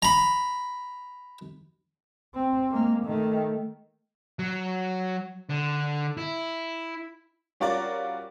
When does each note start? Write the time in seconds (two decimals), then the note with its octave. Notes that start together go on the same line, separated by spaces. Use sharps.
0.02 A#5 B5
2.34 C4
2.70 G#3 A#3
3.05 D#3 A3
4.39 F#3
5.49 D3
6.17 E4
7.60 G3 C#4 F4 F#4 A#4 D5